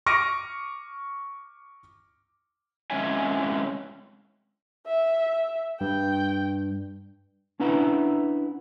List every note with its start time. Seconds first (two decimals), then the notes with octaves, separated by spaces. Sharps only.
0.06 C#6 D6 F6 A#6 D7 D#7
2.90 G#3 C4 C#4 C#5 E5 G#5
4.86 E5
5.81 G2 G5
7.60 C#4 D4 E4 B4 F#5 A#5